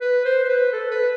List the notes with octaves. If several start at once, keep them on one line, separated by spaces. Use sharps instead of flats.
B4
C5
C5
B4
A4
B4